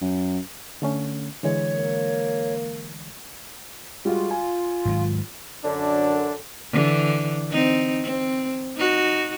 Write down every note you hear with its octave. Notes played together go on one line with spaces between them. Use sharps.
F#2
D3 A3 C#4
D3 E3 G#3 C#5
A#3
G3 G#3 F4 F#4
G#5
G#2 D#3 F#3
F#2 D3 D4
D3 E3
C4 D#4
C4
D#4 F#4